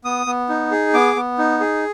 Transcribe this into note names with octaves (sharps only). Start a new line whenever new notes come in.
B3 D#6
B3
D#4
G#4
B3 D6
B3
D#4
G#4